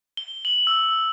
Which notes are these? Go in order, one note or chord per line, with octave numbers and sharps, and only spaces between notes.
G7
F#7
E6